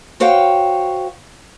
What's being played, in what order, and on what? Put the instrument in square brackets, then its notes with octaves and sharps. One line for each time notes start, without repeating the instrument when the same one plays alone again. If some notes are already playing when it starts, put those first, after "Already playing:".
[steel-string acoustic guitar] F#4 C5 C#5 F5 G5